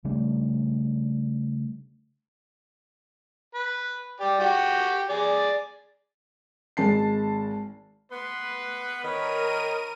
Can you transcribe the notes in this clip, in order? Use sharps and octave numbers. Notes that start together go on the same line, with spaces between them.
C#3 G3 A3 D4
B4
G4 D5
F#4 G4 G5
G#4 D5
G#1 G#3 A5 C7
B3 B4 C6
D#3 A#4 C#5 B5 D#7